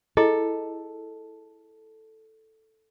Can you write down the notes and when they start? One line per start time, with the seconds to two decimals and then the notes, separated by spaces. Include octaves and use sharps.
0.17 E4 G#4 A4 D#5